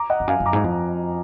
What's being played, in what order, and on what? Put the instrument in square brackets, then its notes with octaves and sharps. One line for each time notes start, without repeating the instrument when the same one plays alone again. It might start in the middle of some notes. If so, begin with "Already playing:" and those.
Already playing: [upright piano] A#5 D6
D#5 F#5
[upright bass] F2
[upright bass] F#2 [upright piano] F5 G#5
[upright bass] F#2
[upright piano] A#5 D6
[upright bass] G#2
F2